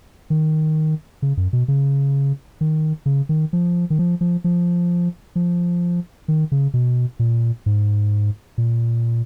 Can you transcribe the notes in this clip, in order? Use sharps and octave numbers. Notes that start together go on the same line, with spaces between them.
D#3
C#3
F#2
B2
C#3
D#3
C#3
D#3
F3
D#3
F3
F3
F3
F3
D#3
C#3
B2
A#2
G#2
A#2